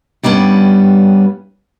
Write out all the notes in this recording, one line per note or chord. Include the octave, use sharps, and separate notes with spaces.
G2 G3 B3 C#4